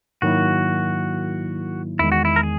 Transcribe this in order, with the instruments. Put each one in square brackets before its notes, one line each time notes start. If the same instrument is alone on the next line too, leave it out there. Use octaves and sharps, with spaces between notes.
[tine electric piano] G#2 D#3 F#3 A#3 E4 [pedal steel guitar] F#4
[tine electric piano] E2 D#3 G#3 [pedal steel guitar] E4
[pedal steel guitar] F#4
E4
A#4
G#4